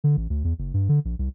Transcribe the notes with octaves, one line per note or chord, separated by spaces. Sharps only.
D3
A1
D2
E2
F#1
G2
D3
A#1
C2